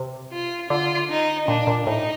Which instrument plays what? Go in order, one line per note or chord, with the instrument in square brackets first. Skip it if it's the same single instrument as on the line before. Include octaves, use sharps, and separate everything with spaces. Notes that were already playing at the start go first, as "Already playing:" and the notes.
Already playing: [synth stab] C3
[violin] F4
[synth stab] D3 [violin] F4
[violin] D#4
[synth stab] A#2 [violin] D4
[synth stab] A#2
[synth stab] A2 [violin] D#4